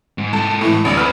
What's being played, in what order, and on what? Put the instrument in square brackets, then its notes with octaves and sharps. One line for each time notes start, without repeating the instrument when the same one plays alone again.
[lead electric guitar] G#2
[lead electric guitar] G#2 A4 [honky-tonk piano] A5
[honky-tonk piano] A2 E3
[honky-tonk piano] A1 D2 [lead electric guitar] C#5 D5
[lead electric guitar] B4 C#5 [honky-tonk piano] B5 E6 F6